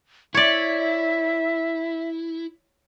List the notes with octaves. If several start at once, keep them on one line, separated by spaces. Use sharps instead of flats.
E4 C#5 D5 E5